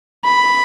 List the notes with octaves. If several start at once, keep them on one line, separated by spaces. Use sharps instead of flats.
B5